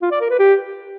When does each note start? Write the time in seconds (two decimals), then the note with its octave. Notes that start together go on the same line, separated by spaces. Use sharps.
0.02 F4
0.12 D5
0.21 A#4
0.30 B4
0.39 G4